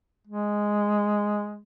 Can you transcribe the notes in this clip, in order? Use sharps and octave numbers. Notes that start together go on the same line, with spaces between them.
G#3